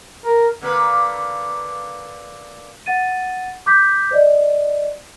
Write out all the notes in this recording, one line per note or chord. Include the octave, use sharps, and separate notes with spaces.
A#4
D3 A#3 B4
F#5 A6 D#7
D6 G6 B6
C5 D5 D#5